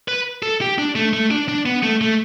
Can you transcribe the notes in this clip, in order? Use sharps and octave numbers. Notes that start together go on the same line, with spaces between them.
B4
A4
G4
D4
A3
A3
D4
D4
B3
A3
A3